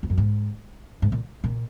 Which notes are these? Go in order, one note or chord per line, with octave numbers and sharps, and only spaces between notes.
F2
F#2
G#2
G#2
A#2
A#2